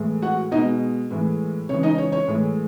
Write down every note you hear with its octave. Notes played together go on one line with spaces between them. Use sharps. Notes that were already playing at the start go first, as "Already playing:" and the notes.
Already playing: A2 E3 G#3
F#4 F#5
B2 G#3 D#4 D#5
A2 E3 G#3
C#3 E3 G#3 C#5
D#4 D#5
C#5
C#5
A2 E3 G#3